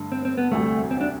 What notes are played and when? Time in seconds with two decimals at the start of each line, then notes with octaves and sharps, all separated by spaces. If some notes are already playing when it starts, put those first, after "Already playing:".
Already playing: G2 D3 A3
0.12 C4
0.25 C4
0.38 B3
0.51 E1 D2 C3 G3 A3
0.91 C4
1.01 D4